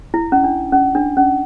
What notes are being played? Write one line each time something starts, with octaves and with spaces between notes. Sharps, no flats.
E4
C#4
D4
C#4
D4
C#4